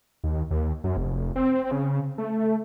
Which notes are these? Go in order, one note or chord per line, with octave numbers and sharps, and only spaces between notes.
D#2
D#2
F#2
F1
C4
C#3
A3